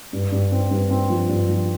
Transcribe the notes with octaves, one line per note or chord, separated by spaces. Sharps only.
G2
G2
C4
G2
C4
F3
G2
F3